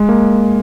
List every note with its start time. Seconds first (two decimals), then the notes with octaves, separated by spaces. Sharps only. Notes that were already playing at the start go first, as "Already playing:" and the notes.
Already playing: G#3
0.09 A#3